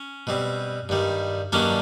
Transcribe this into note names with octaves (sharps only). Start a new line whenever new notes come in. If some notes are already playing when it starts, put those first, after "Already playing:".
Already playing: C#4
B2 G3 C4
G2 D#3 G3
G2 D#3 F#3 A#3 C#4 D4